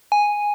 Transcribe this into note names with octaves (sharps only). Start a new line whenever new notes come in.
G#5